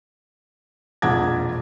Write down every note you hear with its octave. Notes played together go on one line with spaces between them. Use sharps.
E1 A#1 F2 F#5 D6 G#6